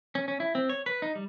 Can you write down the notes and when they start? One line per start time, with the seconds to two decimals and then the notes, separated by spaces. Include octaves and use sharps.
0.15 C#4
0.28 C#4
0.40 E4
0.55 C4
0.69 C#5
0.86 B4
1.02 D#4
1.15 G3